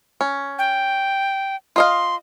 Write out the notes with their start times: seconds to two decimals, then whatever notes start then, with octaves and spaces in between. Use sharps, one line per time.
0.21 C#4
0.59 G5
1.76 F4 D#5 F5 C6